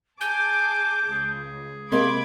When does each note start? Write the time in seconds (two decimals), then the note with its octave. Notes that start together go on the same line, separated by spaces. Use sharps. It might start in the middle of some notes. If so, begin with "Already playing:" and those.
0.21 G#4 G#5 A5 D6 G6
1.12 C#2 G#4
1.92 C3 G#3 A#3 B5 C6 D6 G#6